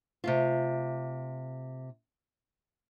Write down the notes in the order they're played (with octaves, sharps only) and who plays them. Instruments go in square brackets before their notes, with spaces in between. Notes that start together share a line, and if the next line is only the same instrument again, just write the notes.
[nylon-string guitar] C3 A3 F4